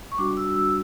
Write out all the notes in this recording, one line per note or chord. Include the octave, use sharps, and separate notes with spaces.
C#6
G3 D4 F#4 D6
E6
E6